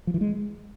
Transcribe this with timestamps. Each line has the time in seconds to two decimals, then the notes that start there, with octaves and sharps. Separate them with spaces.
0.07 F3
0.14 E3
0.21 G#3